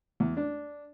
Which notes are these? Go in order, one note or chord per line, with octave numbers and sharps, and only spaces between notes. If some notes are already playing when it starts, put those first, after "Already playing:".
E2
D4